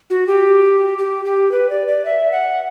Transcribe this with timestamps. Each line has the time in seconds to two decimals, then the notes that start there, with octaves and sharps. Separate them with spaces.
0.10 F#4
0.27 G4
0.98 G4
1.25 G4
1.52 B4
1.70 D5
1.87 D5
2.05 E5
2.32 F#5